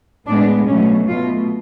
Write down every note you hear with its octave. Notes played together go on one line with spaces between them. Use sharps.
A2 G#3 B3 D4
B2 F#3 A3 C#4
B2 A3 F4